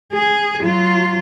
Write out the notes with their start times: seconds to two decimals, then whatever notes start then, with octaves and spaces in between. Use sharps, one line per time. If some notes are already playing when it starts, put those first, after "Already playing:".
0.13 G#4
0.61 F#3 F4